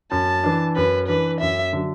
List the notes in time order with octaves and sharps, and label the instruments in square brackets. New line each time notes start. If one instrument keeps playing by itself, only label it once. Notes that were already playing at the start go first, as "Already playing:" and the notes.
[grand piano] F#2 [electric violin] A5
[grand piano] E3 D4
[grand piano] F#2 [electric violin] B4
[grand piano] E3 D4 [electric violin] B4
[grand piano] F#2 [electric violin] E5
[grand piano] D3 F#3